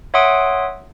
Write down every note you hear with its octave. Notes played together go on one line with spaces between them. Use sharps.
C#5 E5 F#5 C6 D#6 D7